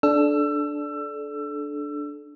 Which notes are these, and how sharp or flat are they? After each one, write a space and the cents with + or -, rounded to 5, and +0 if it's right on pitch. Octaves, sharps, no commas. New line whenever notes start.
D4 +0 A4 -25 E6 +25